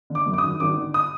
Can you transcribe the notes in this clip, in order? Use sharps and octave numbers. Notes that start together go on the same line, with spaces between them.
D3
D6
F#2
D6
G#1 D#6
G#1 D6
D3
D#6